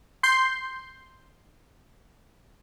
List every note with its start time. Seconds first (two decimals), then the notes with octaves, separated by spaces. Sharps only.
0.23 C6 G6 C7